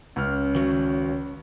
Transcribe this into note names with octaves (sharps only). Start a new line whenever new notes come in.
C#2 C#4 F6
D#3 F#4